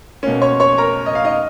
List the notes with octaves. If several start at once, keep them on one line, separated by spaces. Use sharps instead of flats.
B2 A#3 C#4
C#5 C#6
C#5 C#6
A#4 A#5
D#5
F5
D#4 D#5